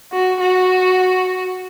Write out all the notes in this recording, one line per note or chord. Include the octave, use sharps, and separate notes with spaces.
F#4
F#4